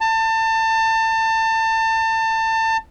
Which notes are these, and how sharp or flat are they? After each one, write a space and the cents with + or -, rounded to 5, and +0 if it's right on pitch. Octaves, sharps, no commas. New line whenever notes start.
A5 +30